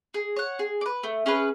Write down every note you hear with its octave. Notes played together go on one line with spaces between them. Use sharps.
G#4
C#5 F#5
G#4
D5
B4
A3
C#4 G#4 B4